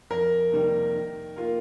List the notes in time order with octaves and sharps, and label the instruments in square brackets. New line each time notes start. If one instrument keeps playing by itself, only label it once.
[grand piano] F2 [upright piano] A#4
[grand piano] C3 D#3 G3 A#3
D#3
A#3 F4 A#4